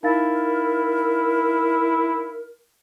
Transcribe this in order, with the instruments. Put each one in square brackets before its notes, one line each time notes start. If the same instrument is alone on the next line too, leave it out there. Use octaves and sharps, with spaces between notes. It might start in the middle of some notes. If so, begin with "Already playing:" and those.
[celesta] D#4 F5 A6 [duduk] E4 [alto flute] A#4